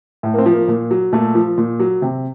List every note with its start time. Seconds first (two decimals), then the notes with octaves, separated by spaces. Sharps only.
0.23 A2
0.34 A#3
0.38 C4
0.46 F3
0.53 A#3
0.68 A#2
0.91 F#3
1.13 A#2 A3
1.35 F3
1.58 A#2
1.80 F#3
2.02 C3